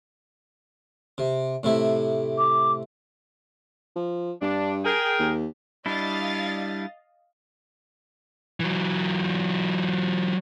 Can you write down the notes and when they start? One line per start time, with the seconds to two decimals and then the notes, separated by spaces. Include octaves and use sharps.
1.18 C3
1.63 A2 C3 E4
2.38 D6
3.96 F3
4.42 G2 D4
4.85 G#4 A#4 G5
5.19 D#2
5.86 G3 D4 E4 D#5 F5 A6
8.60 E3 F#3